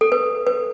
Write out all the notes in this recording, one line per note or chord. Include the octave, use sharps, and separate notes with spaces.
A4
B4
B4